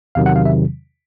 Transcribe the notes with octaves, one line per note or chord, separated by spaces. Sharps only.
E2 C3 D#3 F#3 F5
F#5
F5
E5